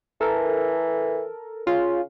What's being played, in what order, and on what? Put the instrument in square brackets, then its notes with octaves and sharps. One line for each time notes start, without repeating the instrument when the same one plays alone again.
[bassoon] E3 [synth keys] A4 A#4
[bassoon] C#3 [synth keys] F4